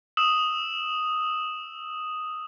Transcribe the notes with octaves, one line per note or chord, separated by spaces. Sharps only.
D#6 E6 E7 F#7